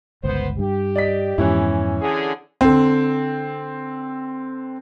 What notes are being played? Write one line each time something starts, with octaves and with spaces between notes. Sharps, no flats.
G1 C#2 B3 C5
G2 G4
D5 D#5 B6
F2 G#2 E3 B3 C#4 E4
D3 G#4
D3 C4